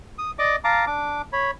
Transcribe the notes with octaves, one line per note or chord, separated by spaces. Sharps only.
D#6
D5 D#5 D6
F5 A5 A#5 D6
D4 D6
C#5 B5